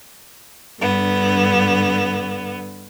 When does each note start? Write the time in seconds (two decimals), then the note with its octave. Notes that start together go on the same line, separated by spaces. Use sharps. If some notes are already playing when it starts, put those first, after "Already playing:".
0.81 G2 D3 B3